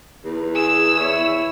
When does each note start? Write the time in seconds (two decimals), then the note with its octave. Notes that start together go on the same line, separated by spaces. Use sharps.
0.25 E2
0.55 G#4 E6
0.96 E4 C#5